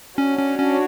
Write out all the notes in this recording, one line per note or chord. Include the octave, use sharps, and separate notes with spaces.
C#4 D4 F#4 C#5
C#4
C#4